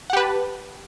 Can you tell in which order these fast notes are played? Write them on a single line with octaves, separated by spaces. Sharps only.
F#5 G4 B4 A5